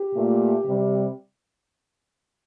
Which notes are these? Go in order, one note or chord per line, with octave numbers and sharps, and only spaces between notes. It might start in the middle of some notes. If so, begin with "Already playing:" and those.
Already playing: G4
A#2 A3
C3 G3